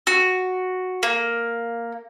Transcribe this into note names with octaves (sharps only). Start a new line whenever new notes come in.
F#4
A#3